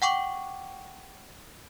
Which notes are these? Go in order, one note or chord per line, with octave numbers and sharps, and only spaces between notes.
F#5 G5 C#6 D6